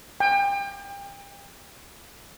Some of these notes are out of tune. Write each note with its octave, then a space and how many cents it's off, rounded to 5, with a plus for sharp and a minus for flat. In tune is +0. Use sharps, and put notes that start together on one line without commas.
G5 +30